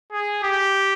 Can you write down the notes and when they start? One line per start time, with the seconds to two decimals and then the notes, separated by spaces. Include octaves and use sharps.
0.13 G#4
0.43 G4